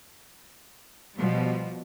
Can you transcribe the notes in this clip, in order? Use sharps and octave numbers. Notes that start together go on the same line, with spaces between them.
B2 F3 G3